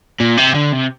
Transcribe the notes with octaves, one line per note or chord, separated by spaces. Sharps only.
A#2
C3
D3
C3